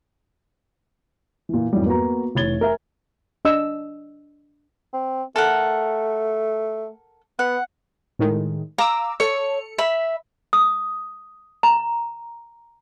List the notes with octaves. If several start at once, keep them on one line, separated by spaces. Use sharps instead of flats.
A#2 E3
F2 G#2 E3 F#3 G3
A#3 B3 F#4 B4 A#5
F1 E3 C#5 G#6 A6 G7
A#4 E5 G#5
D4 D#5 E6
C4
A3 A4 A#4 F#5
B3 F#5
A2 D#3 G#3
F5 A#5 D6 E6
A4 C#5 C#7
E5 B5
D#6
A#5